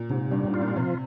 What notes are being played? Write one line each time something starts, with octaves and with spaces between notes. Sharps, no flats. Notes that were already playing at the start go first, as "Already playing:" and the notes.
Already playing: A#2
G#2 C3
G2 G3
G#2
F4
A#2
C3 F3